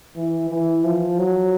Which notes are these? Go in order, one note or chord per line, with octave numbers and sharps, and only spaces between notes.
E3
E3
F3
F#3